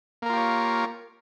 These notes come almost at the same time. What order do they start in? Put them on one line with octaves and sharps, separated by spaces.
A#3 A#4 F4 G4 C#5